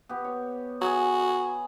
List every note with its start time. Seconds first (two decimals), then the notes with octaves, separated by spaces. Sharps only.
0.09 B3 G4
0.24 C#5
0.81 F#4 G#4 G#5